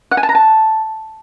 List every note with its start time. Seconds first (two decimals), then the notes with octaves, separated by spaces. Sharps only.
0.11 F#5
0.17 G#5
0.23 A5
0.29 A#5
0.35 A5